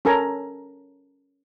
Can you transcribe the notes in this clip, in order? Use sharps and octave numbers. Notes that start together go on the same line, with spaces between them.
C#4 A4 A#4 G#5 A#5